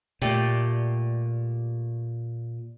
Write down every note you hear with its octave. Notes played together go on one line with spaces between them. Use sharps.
A#2 A3 G4 D5